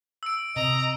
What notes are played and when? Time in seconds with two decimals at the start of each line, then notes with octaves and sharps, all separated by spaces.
0.23 E6 D7
0.56 C3 D#5 A#5